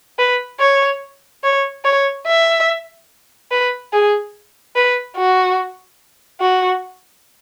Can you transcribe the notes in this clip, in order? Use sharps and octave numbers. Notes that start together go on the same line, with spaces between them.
B4
C#5
C#5
C#5
E5
B4
G#4
B4
F#4
F#4